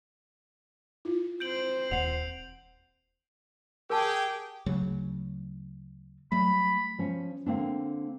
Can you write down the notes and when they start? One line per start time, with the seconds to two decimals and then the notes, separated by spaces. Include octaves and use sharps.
1.05 E4 F4
1.40 C4 C5 G6 D7 F#7
1.91 D#1 F#5 C7 F7
3.90 G4 G#4 A#4 G5 A5
4.66 D2 C#3 F#3
6.32 F#3 G3 A3 B5
6.99 F3 C#4
7.46 D3 A#3 C4 D4